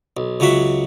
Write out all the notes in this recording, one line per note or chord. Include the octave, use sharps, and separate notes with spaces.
B1
C#2 C#3 F#3 F#4 E5